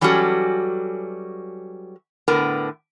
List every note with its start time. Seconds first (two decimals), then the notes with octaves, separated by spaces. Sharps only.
0.01 E3 F#3 G3 C#4 F#4 A4
2.28 A2 D3 B3 A#4